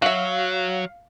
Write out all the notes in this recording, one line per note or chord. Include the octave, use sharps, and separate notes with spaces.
F#3 F#4 E5 F5